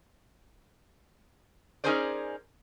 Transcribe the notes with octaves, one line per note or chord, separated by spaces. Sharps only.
C#4 D#4 G#4 A#4 C5 D5